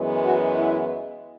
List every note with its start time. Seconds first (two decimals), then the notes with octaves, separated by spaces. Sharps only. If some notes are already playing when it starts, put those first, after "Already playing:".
Already playing: F#2 E3 G#3 B3
0.24 F#4
0.55 E4